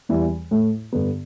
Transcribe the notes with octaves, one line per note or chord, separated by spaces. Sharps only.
E2 E3 G3
A2 A3 E4
G2 D3 B3